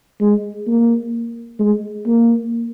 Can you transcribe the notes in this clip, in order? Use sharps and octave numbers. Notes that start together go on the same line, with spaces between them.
G#3
A#3
G#3
A#3